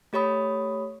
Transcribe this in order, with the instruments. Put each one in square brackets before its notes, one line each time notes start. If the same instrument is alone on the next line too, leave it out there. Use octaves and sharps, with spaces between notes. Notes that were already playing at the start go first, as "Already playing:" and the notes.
[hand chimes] A3 G4 C#5 B5 D#6